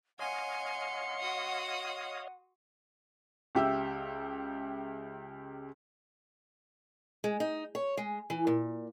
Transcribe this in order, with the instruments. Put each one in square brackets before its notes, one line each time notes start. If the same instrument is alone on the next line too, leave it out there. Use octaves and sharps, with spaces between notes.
[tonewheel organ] C#5 D#5 F5 [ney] F#5 [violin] G#5 [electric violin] C6 C#7
[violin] F#4 D#6
[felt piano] C#2 G4 E5 E6
[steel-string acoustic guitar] G#3
D#4
C#5
G#3
E3
A#2